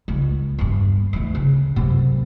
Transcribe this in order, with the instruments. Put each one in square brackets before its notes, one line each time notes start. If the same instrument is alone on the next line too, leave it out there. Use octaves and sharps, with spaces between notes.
[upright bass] C#2
E2 G2
D2 E3
C#3
F#2 C3